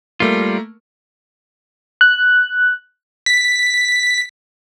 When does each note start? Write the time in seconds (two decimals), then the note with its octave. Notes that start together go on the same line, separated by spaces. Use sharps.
0.20 G3 A3 A#3 F4 A#4
2.01 F#6
3.26 B6